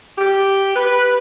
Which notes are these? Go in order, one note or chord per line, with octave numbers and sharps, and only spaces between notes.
G4
B4